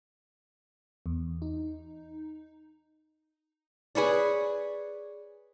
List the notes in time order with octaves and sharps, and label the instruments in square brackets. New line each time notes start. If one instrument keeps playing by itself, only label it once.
[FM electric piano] E2
D#4
[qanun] G#4 B4 C#5 D5